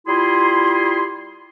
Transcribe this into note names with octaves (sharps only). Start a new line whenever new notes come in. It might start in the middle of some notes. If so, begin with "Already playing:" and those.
G3 E4 F4 G#4 C6